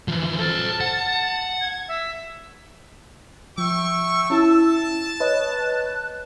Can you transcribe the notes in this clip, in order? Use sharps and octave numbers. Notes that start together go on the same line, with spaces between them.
E3 F3
A4 C5 A5
F#5
G#6
E5
F3 E5 G5 C#6 E6
C#4 E4 A5
B4 C#5 D#5 F#6